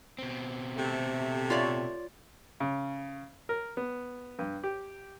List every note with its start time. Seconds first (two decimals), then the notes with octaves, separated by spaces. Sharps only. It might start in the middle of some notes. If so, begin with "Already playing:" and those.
0.18 B2 C4
0.76 C3 A3
1.50 F4 C#5 D5
2.60 C#3
3.49 A#4
3.77 B3
4.39 G2
4.64 G4